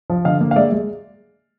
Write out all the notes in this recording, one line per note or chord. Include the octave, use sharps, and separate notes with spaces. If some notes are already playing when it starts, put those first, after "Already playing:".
F3
D3 D#5 F5
A#3
F5
G#3 D5 E5
G#3